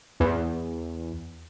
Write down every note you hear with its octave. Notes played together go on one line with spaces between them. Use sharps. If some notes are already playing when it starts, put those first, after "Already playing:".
E2